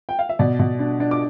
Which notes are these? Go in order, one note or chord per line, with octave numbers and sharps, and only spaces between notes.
G5
F5
E5
B2 D5
B2
D4
D4
D6